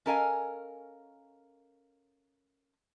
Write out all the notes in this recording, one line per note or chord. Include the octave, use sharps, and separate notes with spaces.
C#4 A4 A#4 D#5 F5 G#5